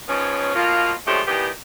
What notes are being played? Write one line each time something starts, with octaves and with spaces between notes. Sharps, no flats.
G#2 F3 B3 C#4
B2 F3 A#3 F4
F3 G#3 A3 C#4 D4 G4
D#3 E3 B3 D4 G4